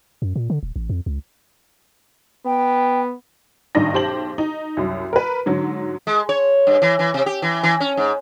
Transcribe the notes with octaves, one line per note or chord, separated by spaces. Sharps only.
F#2
A#2
D3
D#1
A1
F2
C#2
B3 G5
A1 G2 D#3 D4 D#4 A#6
B1 G4 C5 A5 F#7
D#4
C2 F#2
A#4 B4
G#2 D3 F#3
G#3
C#5
G2
E3
E3
C3
G4
E3
E3
C#4
G#2